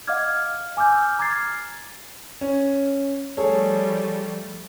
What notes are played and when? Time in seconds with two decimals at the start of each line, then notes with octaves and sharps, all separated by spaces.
0.07 D#5 F5 F#5 D6 F6 G#6
0.77 G#5 D6 E6 F6 G6
1.19 A#5 D6 F6 G#6 A6 C7
2.41 C#4
3.37 F3 G3 A3 G#4 A4 C#5